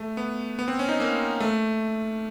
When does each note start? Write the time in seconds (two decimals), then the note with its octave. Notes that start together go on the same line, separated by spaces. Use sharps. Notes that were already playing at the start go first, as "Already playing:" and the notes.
Already playing: A3
0.17 B3
0.59 B3
0.68 C4
0.79 C#4
0.89 D#4
1.00 A#3
1.40 A3